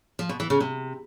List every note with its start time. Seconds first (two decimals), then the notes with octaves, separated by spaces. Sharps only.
0.19 F3
0.29 B2
0.40 E3
0.50 C#3
0.60 C3